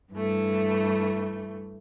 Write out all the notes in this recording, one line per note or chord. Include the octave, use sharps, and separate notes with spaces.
G2 E3 A3